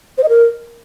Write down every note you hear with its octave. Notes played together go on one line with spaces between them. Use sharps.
C5
D#5
A#4